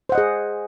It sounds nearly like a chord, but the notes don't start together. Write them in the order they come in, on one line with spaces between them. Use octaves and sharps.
C5 F#5 D#5 G#4